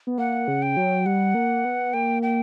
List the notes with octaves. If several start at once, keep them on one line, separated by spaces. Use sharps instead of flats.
B3
A#3 F#5
C#3
G5
F#3
G3 F#5
A#3
B3
A#3 G5
G5